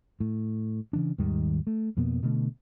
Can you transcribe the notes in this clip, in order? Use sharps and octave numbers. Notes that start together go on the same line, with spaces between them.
A2
C#3 E3 D4
D#2 G#2 D#3 G3
A3
F2 B2 A#3 B3
B2 D3 A3